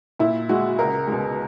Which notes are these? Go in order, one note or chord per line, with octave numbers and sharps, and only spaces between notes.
A#2 E4
G#3 F#4
C#2 A#4
B2 G#3